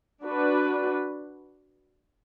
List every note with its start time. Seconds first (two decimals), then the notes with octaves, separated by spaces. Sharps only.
0.23 D4 F#4 B4